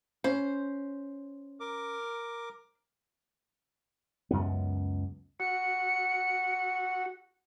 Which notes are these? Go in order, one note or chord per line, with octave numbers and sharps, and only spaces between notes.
C#4 C5
A#4 D6
C#2 F#2 B3
F#4 C#7